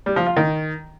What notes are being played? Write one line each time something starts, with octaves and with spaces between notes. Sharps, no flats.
G3
F3
F4
D#3